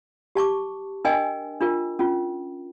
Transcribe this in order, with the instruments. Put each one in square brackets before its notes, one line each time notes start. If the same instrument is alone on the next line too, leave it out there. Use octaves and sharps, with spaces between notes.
[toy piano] G4 A5 C#6 D6
D4 A#4 D#5 G5 G#5
D4 F4 A#4
C#4 F4